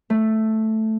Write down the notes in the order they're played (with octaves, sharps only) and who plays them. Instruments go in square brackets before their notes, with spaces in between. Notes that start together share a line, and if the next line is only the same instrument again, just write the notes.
[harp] A3